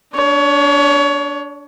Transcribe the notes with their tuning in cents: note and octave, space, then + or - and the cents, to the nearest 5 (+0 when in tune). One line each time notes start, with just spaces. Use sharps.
D4 -20 C#5 +25